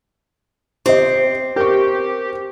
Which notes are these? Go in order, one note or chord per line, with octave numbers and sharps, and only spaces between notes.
C4 G4 D#5
G4 A#4 C#6